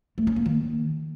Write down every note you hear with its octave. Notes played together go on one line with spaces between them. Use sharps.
A3
C#4
A#3
D#3